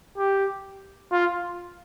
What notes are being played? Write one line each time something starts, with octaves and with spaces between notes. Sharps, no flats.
G4
F4